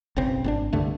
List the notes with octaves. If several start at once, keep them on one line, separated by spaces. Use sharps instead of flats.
F#1 B1 C#3 C4
G#1 C4 D4
C2 G2 D3 A3